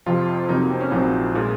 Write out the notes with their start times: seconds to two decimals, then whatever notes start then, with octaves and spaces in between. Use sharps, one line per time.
0.06 F2 C3 F3 F4
0.49 F2 C3 F#3 A#3 D#4
0.70 C4
0.81 C#4
0.91 A#1 A#2 F#3 C4 D#4
1.33 A#2 G#3 F4